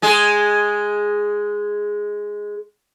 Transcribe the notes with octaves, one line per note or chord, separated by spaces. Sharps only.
G#3 G#4